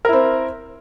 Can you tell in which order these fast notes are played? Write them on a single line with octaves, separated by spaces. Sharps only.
A#4 E4 C4